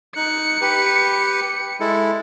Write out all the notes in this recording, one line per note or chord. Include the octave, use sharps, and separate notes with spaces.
D#4 F#6 C#7
G4 B4
G#3 E4 A4